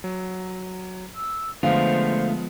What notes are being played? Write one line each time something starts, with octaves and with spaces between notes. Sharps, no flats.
F#3
E6
D3 F3 G#3 A3 B3 F4 C5 F5